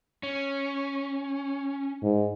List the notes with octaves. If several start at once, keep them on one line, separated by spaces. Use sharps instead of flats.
C#4
G#2